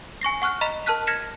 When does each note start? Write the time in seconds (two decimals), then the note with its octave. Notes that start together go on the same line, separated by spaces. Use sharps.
0.21 G#5 C#6 A#6 C7
0.42 F#5 C#6 F6 F#6
0.61 D#5 A#5 B5 B6
0.86 A#4 A5 F6 F#6 B6
1.07 F6 G#6 A#6 B6 C#7 E7